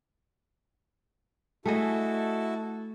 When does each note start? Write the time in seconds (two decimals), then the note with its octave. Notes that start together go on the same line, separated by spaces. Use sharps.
1.66 A3 E4 F#4 G#4 A4 D#5